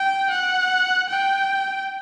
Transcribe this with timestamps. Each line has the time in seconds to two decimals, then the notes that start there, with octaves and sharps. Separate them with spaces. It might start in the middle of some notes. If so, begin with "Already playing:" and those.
Already playing: G5
0.31 F#5
1.10 G5